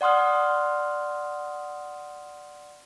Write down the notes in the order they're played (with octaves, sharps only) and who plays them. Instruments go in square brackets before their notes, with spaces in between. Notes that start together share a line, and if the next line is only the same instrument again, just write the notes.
[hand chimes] D5 F#5 C6 D#6 F6